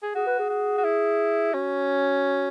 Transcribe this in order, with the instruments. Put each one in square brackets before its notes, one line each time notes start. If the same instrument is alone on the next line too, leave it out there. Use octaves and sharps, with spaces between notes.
[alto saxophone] G#4
[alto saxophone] F#4 [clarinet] G#4
[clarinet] B4
G#4
[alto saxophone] F#4
F#4
E4
[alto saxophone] C#4 [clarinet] F#4